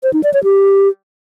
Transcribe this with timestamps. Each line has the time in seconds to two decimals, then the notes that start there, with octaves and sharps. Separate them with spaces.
0.03 C5
0.13 D#4
0.24 D5
0.34 C#5
0.44 G4